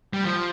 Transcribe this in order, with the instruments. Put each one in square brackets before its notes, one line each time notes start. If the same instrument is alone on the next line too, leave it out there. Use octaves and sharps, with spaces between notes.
[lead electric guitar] G3
F3